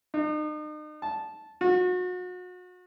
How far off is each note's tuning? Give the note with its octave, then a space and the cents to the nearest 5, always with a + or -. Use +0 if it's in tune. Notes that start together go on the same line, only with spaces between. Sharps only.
D#4 -40
A5 -10
F#4 -35